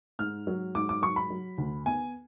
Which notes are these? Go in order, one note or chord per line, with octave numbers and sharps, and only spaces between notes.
G#2 F6
F#3
G#2 D6
D6
F#3 C#6
B5
F#3
D2
B3 G#5